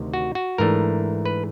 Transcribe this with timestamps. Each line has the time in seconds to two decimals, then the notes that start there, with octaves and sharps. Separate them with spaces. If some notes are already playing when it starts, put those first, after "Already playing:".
Already playing: D2 C3 D#3
0.14 F#4
0.35 F#4
0.58 G#2 E3 A3 D4 A#4
1.25 B4